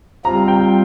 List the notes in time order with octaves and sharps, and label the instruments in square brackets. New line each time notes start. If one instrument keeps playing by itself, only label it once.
[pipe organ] G3 C4 F4 [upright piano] A#5
[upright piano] G5